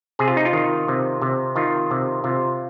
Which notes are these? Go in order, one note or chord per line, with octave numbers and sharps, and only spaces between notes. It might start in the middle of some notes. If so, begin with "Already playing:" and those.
C3 G#4
F4
D#4
F4
D#3
C3
C3
D#3 F4
C3
C3 F4